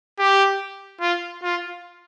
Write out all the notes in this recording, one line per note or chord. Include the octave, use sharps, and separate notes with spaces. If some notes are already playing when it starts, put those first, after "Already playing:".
G4
F4
F4